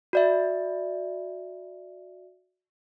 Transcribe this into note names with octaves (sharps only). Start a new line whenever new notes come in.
F#4 D5 E5